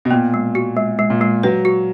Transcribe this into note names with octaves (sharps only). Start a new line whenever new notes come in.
B2
A#2 B3
G#3
F#4
G#3
G#3
A#2
G#3
F#3 B4
F#4